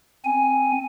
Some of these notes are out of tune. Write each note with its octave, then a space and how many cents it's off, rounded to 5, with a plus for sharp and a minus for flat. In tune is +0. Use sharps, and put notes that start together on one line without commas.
C4 +5 G#5 +0